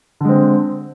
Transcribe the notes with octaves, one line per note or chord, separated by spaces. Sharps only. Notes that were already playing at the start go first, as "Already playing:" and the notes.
D3 G#3 C4